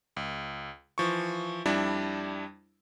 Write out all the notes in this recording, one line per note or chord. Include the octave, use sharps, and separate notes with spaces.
C#2
E3 F3 C#6
F2 G3 D4 E4